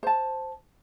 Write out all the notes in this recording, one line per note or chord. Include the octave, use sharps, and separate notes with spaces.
C5 A5